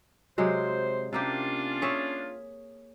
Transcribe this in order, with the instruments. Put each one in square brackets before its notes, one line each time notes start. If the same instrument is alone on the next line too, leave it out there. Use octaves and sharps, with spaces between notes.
[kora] C3 F#3 G#3 [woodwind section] C5
[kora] C3 A#3 G4 [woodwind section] C#4 D4 F4
[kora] G#4 C#5 E5